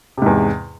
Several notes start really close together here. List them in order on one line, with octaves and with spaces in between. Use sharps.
C3 G#2 E2